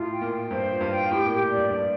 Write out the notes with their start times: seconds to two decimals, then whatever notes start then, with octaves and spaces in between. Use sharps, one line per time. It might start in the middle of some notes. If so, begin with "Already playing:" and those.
Already playing: A2 F4
0.12 G5
0.21 A#2
0.32 G5
0.51 G2 C5
0.72 F4
0.81 G2
0.91 G5
1.11 A2 G4
1.26 A#2 G4
1.41 A2
1.51 D5
1.56 G2
1.70 G2 D5